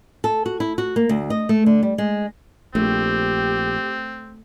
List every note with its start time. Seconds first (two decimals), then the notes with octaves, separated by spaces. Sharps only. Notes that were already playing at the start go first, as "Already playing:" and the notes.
0.24 A4
0.46 F#4
0.60 E4
0.78 F#4
0.96 A#3
1.09 D2
1.30 D#5
1.49 A3
1.66 D3
1.83 G3
1.98 G#3
2.75 A#1 A3 C4 G4